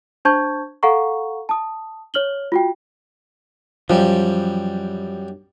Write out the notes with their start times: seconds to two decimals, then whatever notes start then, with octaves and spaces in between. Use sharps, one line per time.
0.25 D4 C5 A5 C#6 G6 G#6
0.83 A4 F5 F#5 A#5 C#6
1.49 A5 D#6
2.14 C#5 F6 F#7 G7
2.52 F4 F#4 G5
3.90 F#2 F3 G3